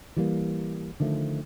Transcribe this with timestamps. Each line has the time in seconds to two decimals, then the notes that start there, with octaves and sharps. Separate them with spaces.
0.17 E3 G3 A#3
1.00 D3 D#3 F3 A3